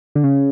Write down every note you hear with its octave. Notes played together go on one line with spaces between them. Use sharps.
D3
C#3